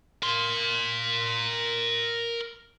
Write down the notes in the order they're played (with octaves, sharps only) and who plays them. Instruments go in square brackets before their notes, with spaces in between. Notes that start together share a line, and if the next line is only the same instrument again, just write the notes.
[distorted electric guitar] A#4 C6